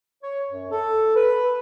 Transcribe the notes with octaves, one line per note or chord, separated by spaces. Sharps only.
C#5
F#2
A4
B4